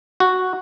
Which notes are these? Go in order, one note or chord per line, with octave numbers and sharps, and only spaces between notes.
F#4